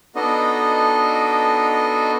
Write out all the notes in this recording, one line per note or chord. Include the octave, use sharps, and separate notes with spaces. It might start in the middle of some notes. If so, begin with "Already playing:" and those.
B3 D4 D#4 F#4 A4 D#5